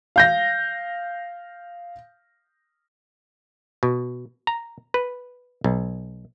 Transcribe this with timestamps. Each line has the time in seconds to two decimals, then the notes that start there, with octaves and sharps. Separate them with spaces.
0.16 F5 G6 A#6
3.83 B2
4.47 A#5
4.94 B4
5.64 B1